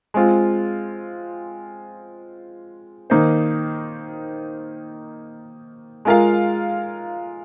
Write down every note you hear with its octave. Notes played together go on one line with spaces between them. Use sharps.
G#3 C4 F4
D#3 A#3 D#4 C5
G#3 F4 A#4 F5